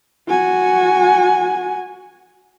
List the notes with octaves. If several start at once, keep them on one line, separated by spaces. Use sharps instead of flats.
F#4 G#5